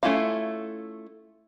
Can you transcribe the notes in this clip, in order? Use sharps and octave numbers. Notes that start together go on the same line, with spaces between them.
A3 C#4 E4 F4 F5